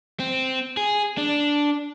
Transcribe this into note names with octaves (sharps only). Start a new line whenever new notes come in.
C4
G#4
D4